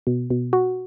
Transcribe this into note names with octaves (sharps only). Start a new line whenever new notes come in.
B2
B2
F#4